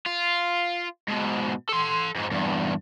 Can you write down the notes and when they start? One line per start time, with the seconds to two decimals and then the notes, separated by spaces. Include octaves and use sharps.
0.06 F4
1.08 G#2 B2
1.69 A4 C6
2.15 F2 G#2
2.31 E2 G2